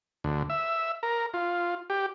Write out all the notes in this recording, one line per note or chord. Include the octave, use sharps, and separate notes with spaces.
D2
E5
A#4
F4
G4